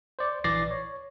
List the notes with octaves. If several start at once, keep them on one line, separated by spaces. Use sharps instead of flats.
C5 D5
A#1 E3 D5 A6 A#6 C7
C#5